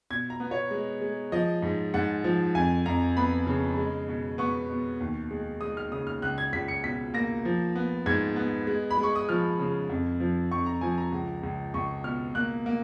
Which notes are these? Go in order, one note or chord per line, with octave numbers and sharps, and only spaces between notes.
B2 G#6
A#5
B3
C#5
G#3
G#3
F3 D#5
G#2
G#2 F#5
F3
F2 G#5
F2 A#5
B3 B5
C#3
G#3
B2
B3 C#6
B2
D#2
G#3
G#3 D#6
F6
C#3 D#6
F6
C#2 F#6
G#6
C#2 B6
C#7
B2 B6
A#3 A#6
F3
B3
G#2 G#6
B3
G#3
B5
G#3
C#6
D#6
F3 F6
C#3
F2
F3
F2 C#6
A#5
F3 G#5
A#5
C#2
C#2
C#2 C#6
B2 F6
A#3 F#6
A#3